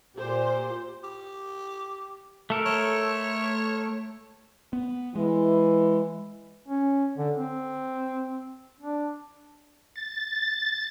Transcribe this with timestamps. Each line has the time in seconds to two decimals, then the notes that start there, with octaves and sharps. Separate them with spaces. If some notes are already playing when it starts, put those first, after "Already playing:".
0.16 A#2 G4 C5
1.04 G4
2.50 A3 A4 A#4
2.66 C#5
4.73 B3
5.16 E3 G#3
6.68 C#4
7.18 D3
7.36 C4
8.81 D4
9.96 A6